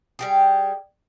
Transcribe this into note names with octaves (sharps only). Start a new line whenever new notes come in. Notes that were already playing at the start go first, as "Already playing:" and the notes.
G3 G4 G#4